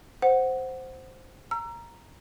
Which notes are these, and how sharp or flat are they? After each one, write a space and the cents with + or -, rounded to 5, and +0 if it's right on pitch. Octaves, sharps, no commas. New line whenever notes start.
C5 +0 F#5 +0
A#5 +0 E6 +40